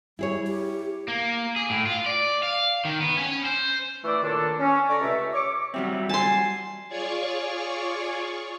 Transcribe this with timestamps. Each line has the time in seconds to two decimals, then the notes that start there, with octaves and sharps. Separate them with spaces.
0.19 G3 E4 G#4 C#5
0.47 G4
1.08 A#3
1.56 G#4
1.70 A2
1.86 F4
2.06 D5
2.43 F5
2.85 D#3
3.01 B3
3.17 C#4
3.45 C5
4.04 E3 A3 D5 E6
4.22 A#2 D#3 D4 A4 C#5
4.59 C#4
4.89 D3 D5 A#5 C#6
5.01 C#2 C3 A3 E5
5.34 C#5 C#6 D6
5.74 F#3 G3 C4 E5
6.09 G#5 A5 C6
6.88 F4 G#4 C#5 D5 C#6